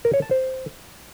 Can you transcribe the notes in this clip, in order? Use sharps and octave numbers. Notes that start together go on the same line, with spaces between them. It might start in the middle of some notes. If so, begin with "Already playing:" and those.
A#4
C#5
A5
C5